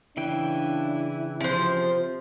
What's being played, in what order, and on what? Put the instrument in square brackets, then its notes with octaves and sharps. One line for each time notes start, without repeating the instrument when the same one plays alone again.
[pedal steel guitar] C#3 E3 G5 [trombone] D4 [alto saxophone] E4
[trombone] C3 [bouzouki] F3 C5